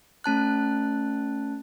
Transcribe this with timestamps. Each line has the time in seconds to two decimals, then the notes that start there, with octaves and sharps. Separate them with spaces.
0.24 A3 C#4 A5 F#6